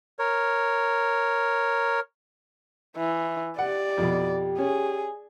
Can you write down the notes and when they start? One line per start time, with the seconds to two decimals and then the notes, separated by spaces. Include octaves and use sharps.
0.19 A#4 C#5
2.97 E3
3.59 G4 D5 F#5
3.98 F2 B2
4.58 C#4 G#4